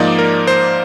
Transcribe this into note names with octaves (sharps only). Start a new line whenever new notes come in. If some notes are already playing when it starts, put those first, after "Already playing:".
Already playing: G#2 F3 A#3 D#4 D5
A#4
C5